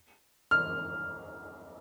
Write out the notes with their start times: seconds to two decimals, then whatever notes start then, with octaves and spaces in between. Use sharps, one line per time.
0.51 F6